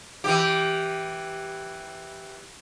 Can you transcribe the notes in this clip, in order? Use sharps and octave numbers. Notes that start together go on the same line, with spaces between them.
E3 G4